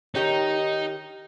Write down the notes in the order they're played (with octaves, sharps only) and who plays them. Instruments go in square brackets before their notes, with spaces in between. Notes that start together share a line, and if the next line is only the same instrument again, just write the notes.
[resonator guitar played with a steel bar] D#3 G4 C#5 [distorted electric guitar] D#4